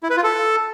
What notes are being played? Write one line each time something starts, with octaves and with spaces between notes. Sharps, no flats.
E4
B4
F4
A4